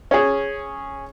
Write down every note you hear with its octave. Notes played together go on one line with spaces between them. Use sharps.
C#4 G#4